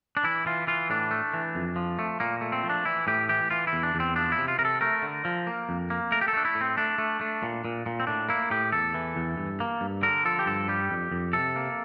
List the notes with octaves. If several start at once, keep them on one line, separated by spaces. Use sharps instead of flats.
D4
E3 E4
E3 F4
E3 F4
A2 D4
A3
E3
F2
F3
A3
A#2 A#3
A3
C4
F3
D4
E3 E4
A2 G4
E3 G4
E3 F4
E4
E2
D4
E2
C4
F3 D4
E4
C3
F4
C3 A#4
A4
A3 A#4
D3
F3
A#3
F2
A#3
A3 A#4
G4
A4
A3 D4
E4
A2
C4
A3 D4
A3
A3
A#2
A#2
A#2
C4
A2 D4
A#3 E4
A2 G4
E2 A4
E3
E2
G2
A#3
G2
D3 A#4
F3 A4
G4
G2 A4
G3 G4
F2
F2
C3 A4
A#3